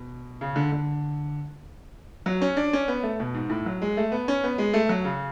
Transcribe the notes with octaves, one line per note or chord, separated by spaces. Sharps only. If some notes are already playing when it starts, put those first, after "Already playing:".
Already playing: B2
C#3
D3
D3
F#3
C#4
D4
C#4
B3
A3
B2
G#2
A2
F#3
G#3
A3
B3
C#4
B3
G#3
A3
F#3
C#3